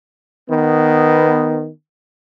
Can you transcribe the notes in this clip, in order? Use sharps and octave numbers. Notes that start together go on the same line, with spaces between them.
D#3 B3